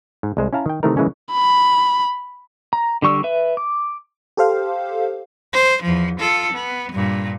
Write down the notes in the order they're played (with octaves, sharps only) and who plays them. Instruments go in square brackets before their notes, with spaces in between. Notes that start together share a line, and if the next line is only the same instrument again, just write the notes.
[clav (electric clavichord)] G#2
C2 G#3 C5
C#4 E4 F5 A5 A#5
D#3 G5
C3 D#3 E3 A3 D#4 A#4
C#3 E3 G#3 A#3 C#4 C#5
[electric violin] B5
[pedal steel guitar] A#5
D3 G3 C#6 E6
B4 E5
D6
[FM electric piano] G4 A4 C5 F5
[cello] C5
E2 F3
F4 A4
B3
G2 A#2